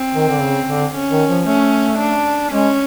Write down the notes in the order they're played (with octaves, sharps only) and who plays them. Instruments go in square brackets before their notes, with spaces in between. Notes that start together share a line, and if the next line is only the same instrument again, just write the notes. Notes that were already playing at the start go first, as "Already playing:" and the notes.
Already playing: [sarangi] C4
[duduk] D#3
D3
C#3
D3
[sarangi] C#4
[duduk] D#3
F3
[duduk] A3 [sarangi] C#4
[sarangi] D4
[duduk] G#3 [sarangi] C#4